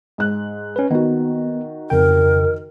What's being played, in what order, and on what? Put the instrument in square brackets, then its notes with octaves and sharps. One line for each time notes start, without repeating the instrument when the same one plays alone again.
[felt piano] G#2 F#6
[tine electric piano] C#4 B4
[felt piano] D#3 F#4 [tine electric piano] B3
[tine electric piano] F2 C#3 G5 [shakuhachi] A#4